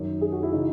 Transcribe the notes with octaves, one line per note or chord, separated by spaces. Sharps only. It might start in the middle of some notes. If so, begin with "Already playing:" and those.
Already playing: F#2 D#3
G#4
F#4
E4
C#3 E3 D#4